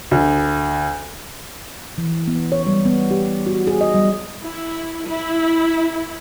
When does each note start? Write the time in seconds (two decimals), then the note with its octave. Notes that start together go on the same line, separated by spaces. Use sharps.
0.11 D2
1.98 E3
2.28 B3
2.52 C#5
2.67 G3
2.85 B3
3.11 G4
3.47 F#4
3.67 G#4
3.81 D#5
3.94 G3
4.44 E4
5.07 E4